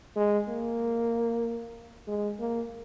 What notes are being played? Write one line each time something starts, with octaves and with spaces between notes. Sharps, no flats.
G#3
A#3
G#3
A#3